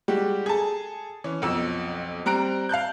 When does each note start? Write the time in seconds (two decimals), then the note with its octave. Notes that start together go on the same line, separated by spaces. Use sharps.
0.08 G3 G#3 F#4 G4
0.46 G#4 A4 A5
1.24 E3 C#4
1.42 B1 F2 E6
2.26 G3 C4 A#5 F#6 D7
2.69 F5 A5 F#6 G6